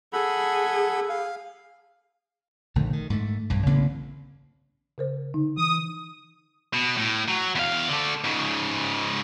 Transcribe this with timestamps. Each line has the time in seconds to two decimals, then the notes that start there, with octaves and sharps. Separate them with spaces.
0.13 G#4 A4 F#5 B5
1.09 F5
2.75 A#1 D3 D#3 A3
2.93 D#3
3.10 G#2 A3
3.50 B1 G2
3.66 A1 C#3 A#3 C4
4.98 C#3 A#4 C5
5.34 D3 D#4
5.57 E3 D#6
6.74 B2
6.97 A2
7.28 F#3
7.55 E2 F5
7.88 D3 A3
8.24 G#2 C#3